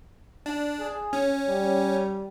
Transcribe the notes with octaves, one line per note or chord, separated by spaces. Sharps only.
D4
G#4
C#4
G3